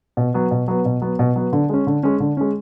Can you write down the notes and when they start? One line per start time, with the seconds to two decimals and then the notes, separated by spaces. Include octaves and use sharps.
0.17 B2
0.34 F#3 B3
0.51 B2
0.68 F#3 B3
0.85 B2
1.02 F#3 B3
1.19 B2
1.36 F#3 B3
1.53 D3
1.69 G#3 C#4
1.87 D3
2.03 G#3 C#4
2.20 D3
2.37 G#3 C#4